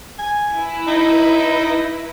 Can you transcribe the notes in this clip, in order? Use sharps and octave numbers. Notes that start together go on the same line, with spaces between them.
G#5
E4 B4
D#4